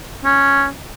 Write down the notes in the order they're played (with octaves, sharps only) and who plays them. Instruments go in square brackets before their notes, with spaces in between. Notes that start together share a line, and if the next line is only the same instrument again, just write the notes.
[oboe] C#4